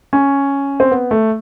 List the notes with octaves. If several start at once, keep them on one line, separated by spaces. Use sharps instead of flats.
C#4
C4
B3
A3